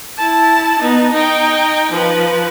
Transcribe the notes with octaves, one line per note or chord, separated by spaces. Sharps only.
E4 A5
B3 D#4
D#4 G5
F3 B4